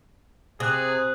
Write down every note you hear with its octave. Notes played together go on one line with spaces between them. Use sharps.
C3 G#4 D#6 F#6